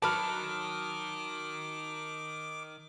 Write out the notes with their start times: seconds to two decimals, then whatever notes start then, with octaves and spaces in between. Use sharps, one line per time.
0.02 D#3 F#3 B4 A5 D6 F6